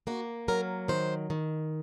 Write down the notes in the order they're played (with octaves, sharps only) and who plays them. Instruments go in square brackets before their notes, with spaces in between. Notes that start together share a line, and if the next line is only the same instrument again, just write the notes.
[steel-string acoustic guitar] A#3 F#4
F#3 A#4
D#3 C5
D#3